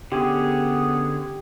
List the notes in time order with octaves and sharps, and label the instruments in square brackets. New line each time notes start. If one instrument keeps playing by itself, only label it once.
[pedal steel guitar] D3 C#4 G#4 [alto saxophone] B3 [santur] G4